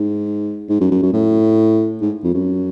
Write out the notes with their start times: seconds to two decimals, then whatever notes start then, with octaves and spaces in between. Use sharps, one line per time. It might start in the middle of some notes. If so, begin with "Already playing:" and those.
Already playing: G#2
0.69 G#2
0.80 F#2
0.91 F#2
1.02 F#2
1.13 A2
2.01 G#2
2.23 F2
2.34 F#2